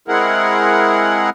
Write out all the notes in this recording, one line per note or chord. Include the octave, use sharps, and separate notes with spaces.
G#3 C4 E4 G#4 A#4 F#5